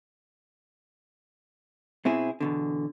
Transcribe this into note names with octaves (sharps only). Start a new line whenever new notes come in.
B2 C4 E4 G#4
E2 B2 D3